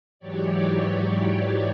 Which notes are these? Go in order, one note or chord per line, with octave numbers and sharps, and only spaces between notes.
G#2 E3 F#3 G4 C#5 D5